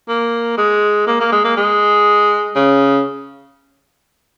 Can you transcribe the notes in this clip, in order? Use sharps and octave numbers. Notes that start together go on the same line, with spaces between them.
A#3
G#3
A#3
A#3
G#3
A#3
G#3
C#3